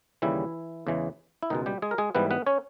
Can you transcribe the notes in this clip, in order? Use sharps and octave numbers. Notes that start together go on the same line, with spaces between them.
D#2 C#3 E3 G3 E4
E2 C#3 E3 G#3
E4
C#2 B2 D#3 G#3 D#4
G3 G4
G#3 G#4
A#4
G#3 G#4
G#2 E3 G3 B3 B4
B3 B4
C#4 C#5